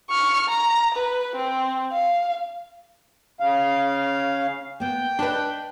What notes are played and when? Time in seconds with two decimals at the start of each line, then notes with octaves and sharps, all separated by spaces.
0.10 C#6 F6
0.49 A#5
0.95 B4
1.36 C4
1.92 F5
3.40 C#3 F5
4.80 A#3 B3 G5
5.19 D4 B4 D#5 A5